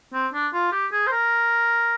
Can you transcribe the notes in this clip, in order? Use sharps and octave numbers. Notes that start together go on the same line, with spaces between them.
C4
D4
F4
G4
G#4
C5
A#4